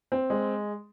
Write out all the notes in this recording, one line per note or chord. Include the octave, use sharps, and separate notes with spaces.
C4
G#3